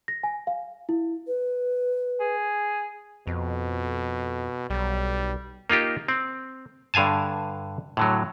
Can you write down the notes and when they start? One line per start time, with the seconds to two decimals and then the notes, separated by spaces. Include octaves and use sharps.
0.08 A#6
0.23 G#5
0.47 F5
0.89 E4
1.27 B4
2.20 G#4
3.27 F2 B2
4.70 B1 G3
5.70 A#3 D#4 F4 G4
6.08 C4
6.94 G2 D3 F5 G#5 A5
7.97 A2 D3 F#3